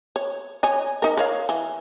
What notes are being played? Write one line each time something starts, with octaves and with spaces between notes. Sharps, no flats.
C#5
C#5 D#5 G#5
D#4 A#4
A#4 C#5 F5
E3